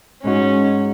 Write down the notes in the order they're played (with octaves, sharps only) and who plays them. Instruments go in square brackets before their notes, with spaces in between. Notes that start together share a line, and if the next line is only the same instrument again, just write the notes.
[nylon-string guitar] G#2 G#3 D#4 F#4 [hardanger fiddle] C#4